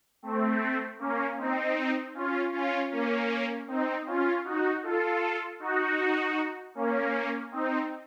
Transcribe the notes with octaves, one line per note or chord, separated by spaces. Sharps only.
A3 C4
A#3 C#4
C4 D#4
C#4 F4
C#4 F4
A#3 C#4
C4 D#4
C#4 F4
D#4 F#4
F4 A4
D#4 F#4
A#3 C#4
C4 D#4